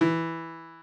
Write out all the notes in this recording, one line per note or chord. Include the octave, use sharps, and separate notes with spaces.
E3